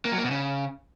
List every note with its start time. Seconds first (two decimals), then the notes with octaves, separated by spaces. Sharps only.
0.05 A#3
0.12 F#3
0.18 A#3
0.24 B2
0.31 C#3